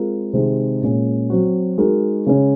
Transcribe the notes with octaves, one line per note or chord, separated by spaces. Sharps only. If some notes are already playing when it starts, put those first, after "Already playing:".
Already playing: G#3 C4 F4 A#4
C3 D#3 G#3 C4 D#4
A#2 G#3 C#4 G#4
F#3 C4 F#4
G#3 D#4 F#4 A#4
C#3 G#3 C#4